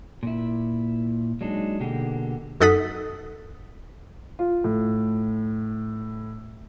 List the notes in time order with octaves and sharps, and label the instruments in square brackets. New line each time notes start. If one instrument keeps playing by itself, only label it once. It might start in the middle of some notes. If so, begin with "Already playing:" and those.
[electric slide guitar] A#2 E4
F#3 G#3 D4 D#4
B2 D3 A#3 G4 G#4
[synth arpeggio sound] F#2 D#4 A4 F#5 D#6 B6
[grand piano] F4
A2